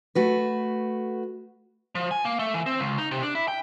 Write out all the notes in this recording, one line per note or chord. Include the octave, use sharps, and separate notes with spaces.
A3 F#4 B4
F3
G#5
A#3
A3
E3
C4
C#2
D#4
C3
D4
E4
G5